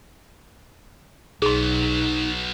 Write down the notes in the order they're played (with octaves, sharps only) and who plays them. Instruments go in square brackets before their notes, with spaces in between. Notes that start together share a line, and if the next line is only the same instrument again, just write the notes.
[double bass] B1 [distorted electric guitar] F#3 B3 [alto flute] D#4 [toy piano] G#4 C6